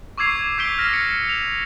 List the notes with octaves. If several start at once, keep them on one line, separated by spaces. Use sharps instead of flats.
C#6 D6 E6 G#6 C7 F7
D6 G6 B6 C7 D7 G7
F6 A#6
C#7
F7